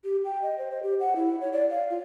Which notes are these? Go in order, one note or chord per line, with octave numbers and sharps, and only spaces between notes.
G4
G5
D#5
C5
C5
G4
F#5
E4
C#5
D5
F5
F4